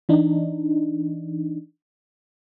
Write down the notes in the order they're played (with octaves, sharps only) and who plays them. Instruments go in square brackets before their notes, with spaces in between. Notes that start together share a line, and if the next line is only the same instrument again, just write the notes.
[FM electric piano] E3 D4 D#4